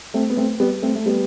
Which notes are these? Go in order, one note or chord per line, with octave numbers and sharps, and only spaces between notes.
A3 C4
B3
A3 C4
G3 B3
A3 C4
A3
G3 B3